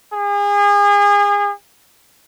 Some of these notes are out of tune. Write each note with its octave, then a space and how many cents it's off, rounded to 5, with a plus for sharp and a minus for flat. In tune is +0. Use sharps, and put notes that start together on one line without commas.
G#4 -35